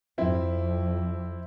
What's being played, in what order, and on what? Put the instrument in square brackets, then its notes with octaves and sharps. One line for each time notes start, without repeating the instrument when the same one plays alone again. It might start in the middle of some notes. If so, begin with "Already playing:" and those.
[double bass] F2 [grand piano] C4 E4